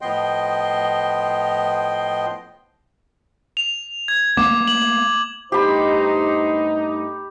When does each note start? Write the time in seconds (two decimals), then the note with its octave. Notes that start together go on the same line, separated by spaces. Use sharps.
0.01 A2 F3 B3 D#5 G5 C6
3.57 F7
4.08 G#6
4.37 A#3 B3 D6
4.67 F#7
5.52 G2 A3 D#4 G4 C5 B5